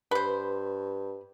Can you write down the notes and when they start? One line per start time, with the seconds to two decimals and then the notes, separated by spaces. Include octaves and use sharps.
0.11 G2 B4 C5